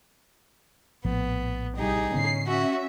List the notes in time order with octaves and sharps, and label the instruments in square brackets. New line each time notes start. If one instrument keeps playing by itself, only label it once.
[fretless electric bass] A#1 A2 F3 [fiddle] B3
[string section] C2 G4 [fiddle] D#4 G#4
[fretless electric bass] A2 D3 B3 [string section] C#4 C7
[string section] C#4 E5 [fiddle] F#4